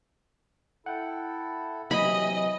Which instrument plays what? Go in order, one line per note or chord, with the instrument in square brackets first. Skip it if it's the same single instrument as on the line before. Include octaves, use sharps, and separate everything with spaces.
[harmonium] E4 A4 [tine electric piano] F#5 G5
[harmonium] C3 E3 [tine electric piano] F#3 [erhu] D#5 [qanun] B5